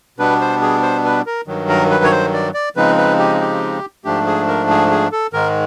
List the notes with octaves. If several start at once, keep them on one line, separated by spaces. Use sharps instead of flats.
B2 G3 B3 D4 B4
C5
G#4
C5
B4
A#4
G2 D#3 F#3
A#4
B4
C#5
C5
D5
D5
C#3 F3 G#3 C4 D#4 B4
B4
G4
G4
G#2 F3 A3 D4 G4
G#4
A#4
G#4
G#4
A4
G#2 D#3 G#3 A#4